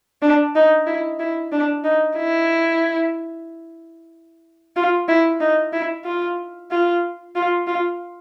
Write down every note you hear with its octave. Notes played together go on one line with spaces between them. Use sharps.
D4
D#4
E4
E4
D4
D#4
E4
F4
E4
D#4
E4
F4
F4
F4
F4